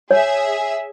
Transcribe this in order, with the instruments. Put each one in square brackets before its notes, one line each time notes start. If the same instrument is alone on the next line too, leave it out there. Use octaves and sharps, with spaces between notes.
[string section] G#4 E5 [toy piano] C#5